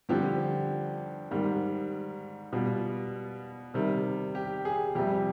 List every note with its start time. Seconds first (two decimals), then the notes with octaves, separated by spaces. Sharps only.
0.09 G2 D3 F3 G4
1.31 G#2 D#3 G3
2.53 B2 G3 F4
3.74 C3 D#3 G3
4.35 G4
4.65 G#4
4.95 F2 C3 G3 G4